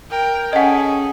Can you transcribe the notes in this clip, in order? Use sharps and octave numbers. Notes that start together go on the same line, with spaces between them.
A#4 G5
C#4 G#4 A4 D#5 F#5